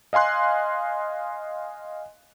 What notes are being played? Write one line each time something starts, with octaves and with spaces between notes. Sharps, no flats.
D#5 F5 G#5 C6 F#6